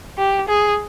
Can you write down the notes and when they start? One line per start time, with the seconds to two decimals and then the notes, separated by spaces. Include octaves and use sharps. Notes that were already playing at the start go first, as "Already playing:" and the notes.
0.17 G4
0.48 G#4